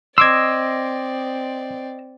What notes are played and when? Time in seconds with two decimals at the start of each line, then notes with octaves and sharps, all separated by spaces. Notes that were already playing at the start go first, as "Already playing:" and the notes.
0.18 C4 D5 D#5 C6 D6 E6 G#6